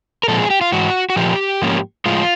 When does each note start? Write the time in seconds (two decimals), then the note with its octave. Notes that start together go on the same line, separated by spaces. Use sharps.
0.23 A#4
0.28 A#2 F3 G#3 C4 A4
0.39 G#4
0.50 G4
0.61 F4
0.72 G#2 E3 F#4
1.10 F#4
1.16 A#2 F3 A#3 G4
1.61 G#2 F3 A#3 C#4
2.06 A2 F3 G#3 F4